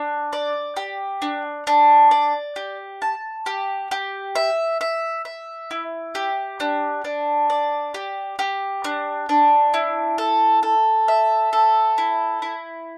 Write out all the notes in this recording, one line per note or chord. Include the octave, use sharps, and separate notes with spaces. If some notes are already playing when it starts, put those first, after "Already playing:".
Already playing: D4
D5
G4
D4
D4
D5
G4
A5
G4
G4
E5
E5
E5
E4
G4
D4
D4
D5
G4
G4
D4
D4
E4
A4
A4
E5
A4
E4
E4